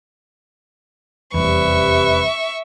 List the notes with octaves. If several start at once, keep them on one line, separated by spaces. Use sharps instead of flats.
F1 E2 C3 G3 B4 E5 C#6